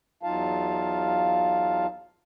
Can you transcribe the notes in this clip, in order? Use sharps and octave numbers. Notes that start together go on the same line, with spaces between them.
E2 F#3 D#4 F4 F5 A5